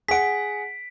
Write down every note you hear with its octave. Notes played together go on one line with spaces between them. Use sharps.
G#4 F#5 B6 D7